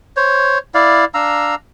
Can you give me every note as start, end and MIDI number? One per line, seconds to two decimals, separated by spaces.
0.17 0.58 72
0.17 0.58 73
0.74 1.05 64
0.74 1.05 74
0.74 1.05 77
1.14 1.55 62
1.14 1.55 77
1.14 1.55 82
1.14 1.55 88